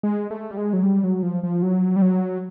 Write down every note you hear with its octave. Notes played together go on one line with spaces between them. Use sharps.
G#3
A3
G3
G#3
F#3
G3
F#3
F3
F3
F#3
G3
F#3